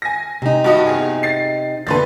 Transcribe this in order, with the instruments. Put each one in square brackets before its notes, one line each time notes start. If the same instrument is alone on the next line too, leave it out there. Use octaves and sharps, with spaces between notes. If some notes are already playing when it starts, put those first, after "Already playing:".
[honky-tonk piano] G#5 A#6
[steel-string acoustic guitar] C3 D#4
[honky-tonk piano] G2 F#4 D#5
E2 G#4
A6 C7
[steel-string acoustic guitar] E2 A#2 D3 [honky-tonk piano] B4 C6 A6